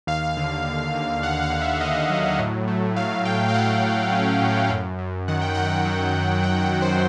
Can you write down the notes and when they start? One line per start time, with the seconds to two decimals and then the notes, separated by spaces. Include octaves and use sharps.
0.07 D#2 F5
0.37 D3
0.65 D#2
0.94 D#2
1.23 D#2 F#5
1.42 F5
1.52 D3
1.62 E5
1.81 D#2 D#5
2.10 F#3
2.39 A2
2.68 A3
2.96 F#3 F5
3.25 F#3 G5
3.49 F5
3.54 F#3 F#5
3.83 A2
4.12 C#4
4.42 A2
4.70 F#2
4.99 F#2
5.28 D#3 F#5
5.42 G5
5.55 F#2 F#5
5.85 F#3
6.15 D#3
6.43 F#3 G5
6.62 F#5
6.72 D#3
6.82 C5